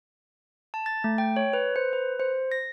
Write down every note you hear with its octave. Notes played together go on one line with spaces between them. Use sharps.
A5
A6
A3
G5
C#5
B4
C5
B4
C5
A#6